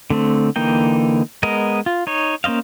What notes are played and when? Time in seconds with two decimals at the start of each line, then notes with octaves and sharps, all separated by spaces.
0.10 D3 A3 C4
0.56 D3 E3 A#3 D#4 G5
1.43 G#3 B3 A#4 D#5
1.86 F4
2.07 D#4 C#5
2.44 A#3 C#4 C5 D#5 F5